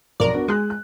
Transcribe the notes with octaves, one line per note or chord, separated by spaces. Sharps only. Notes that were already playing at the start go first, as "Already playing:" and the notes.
B1 F2 A#4 D5
B3 D4 F#4
G#3 G#4 F#6
F#6